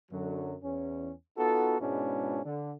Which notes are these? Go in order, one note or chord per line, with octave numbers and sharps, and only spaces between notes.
F#2 D3 F#3
E2 C#4
B3 D#4 F4 F#4 A4
G#2 B2 G#3 C#4 D4 E4
D3